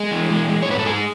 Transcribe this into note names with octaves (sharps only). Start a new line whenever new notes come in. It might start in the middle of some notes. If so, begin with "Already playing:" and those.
Already playing: G#3 G#4
E3
G#3
G#3
C#5
G#2 B4
A4
G#2 G#3 G#4